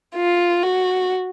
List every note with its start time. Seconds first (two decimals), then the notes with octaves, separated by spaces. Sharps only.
0.15 F4
0.63 F#4